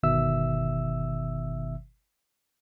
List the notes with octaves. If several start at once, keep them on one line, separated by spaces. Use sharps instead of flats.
G1 B2 D#3 E5 E6